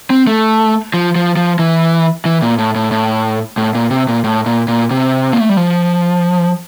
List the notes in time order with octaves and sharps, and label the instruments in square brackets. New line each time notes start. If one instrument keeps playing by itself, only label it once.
[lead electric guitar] C4
A3
F3
F3
F3
E3
E3
A#2
A2
A2
A2
A2
A#2
C3
A#2
A2
A#2
A#2
C3
A#3
A3
G3
F3